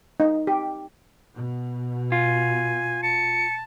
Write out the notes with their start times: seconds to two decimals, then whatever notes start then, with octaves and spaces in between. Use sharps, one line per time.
0.20 D#4
0.47 G4
1.34 B2
2.12 F4 G#5
3.03 A5 C#7